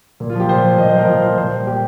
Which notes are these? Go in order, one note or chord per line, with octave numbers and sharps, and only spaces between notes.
A#2
F4
F3 G4
A#2 C5
F3
A#2 D#5
C5
F3 A#4
A#2 F4
F3 C5
A#2 C5
G3
A#2 G4